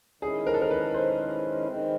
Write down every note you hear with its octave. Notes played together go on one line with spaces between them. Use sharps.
D#3 G#3 C#4 E4 G#4
A#4
A4
A#4
B4
C5
D#3 G#3 C4